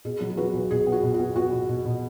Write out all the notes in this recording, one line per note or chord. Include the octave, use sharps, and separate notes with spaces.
B2 G#4
F#3
G#4
F#3 F#4 B4
B1
B2 G#4
B3
F#4
B2
F#4
B3
B3 F#4
B2
B2
B2